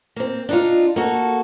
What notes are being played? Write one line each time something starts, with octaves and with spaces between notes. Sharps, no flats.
A#3 C4
D4 D#4 F4
A#3 F#4 A4